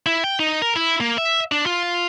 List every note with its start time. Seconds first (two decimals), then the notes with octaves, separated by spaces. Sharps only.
0.06 E4
0.24 G5
0.39 D#4
0.62 A#4
0.76 E4
1.01 A#3
1.18 E5
1.52 D4
1.66 F4